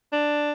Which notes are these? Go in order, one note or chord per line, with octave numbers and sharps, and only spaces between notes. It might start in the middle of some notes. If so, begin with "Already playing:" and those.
D4